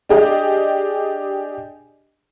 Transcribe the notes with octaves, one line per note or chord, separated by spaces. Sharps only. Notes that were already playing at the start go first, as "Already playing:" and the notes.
D4 G4 G#4 D#5